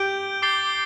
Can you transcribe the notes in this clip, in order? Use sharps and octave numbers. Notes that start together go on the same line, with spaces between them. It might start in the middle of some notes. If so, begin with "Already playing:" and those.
Already playing: G4 G6 D7 G7
D6 A6 C7 G7